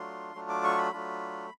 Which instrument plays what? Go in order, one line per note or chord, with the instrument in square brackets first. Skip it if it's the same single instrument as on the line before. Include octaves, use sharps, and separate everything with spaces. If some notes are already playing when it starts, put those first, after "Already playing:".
Already playing: [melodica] F#3 A3 D4 F4 C6
F#3 A3 D4 F4
D6
C#6
B5
F#3 A3 D4 F4